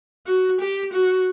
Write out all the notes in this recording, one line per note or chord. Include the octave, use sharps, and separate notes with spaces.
F#4
G4
F#4